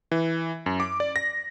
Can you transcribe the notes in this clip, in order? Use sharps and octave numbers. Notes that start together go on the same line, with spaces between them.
E3
F#2
D6
D5
A#6